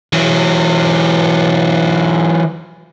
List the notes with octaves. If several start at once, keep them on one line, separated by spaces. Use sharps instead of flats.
E3 F#3